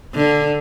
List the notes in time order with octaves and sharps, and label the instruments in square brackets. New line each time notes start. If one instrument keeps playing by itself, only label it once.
[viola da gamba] D3